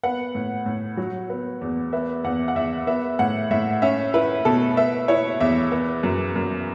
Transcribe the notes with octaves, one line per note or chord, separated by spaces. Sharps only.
B3 F#5
A2
A2
F#3
B3
E2
B3 E5
E2 F#5
F#5
E2 E5
B3 E5
A2 F#5
A2 E5
C#4 E5
E4 B4
B2 A4
B3 E5
E4 C#5
E2 E5
B3
F#2
F#2